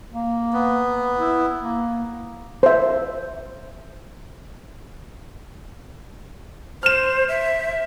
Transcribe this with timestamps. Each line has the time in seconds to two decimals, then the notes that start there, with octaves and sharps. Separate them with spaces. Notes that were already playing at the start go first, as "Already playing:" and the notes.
0.12 A#3
0.53 B3
1.19 E4
1.61 A#3
2.63 C5 E5
6.83 C5 F6 E7
7.28 E5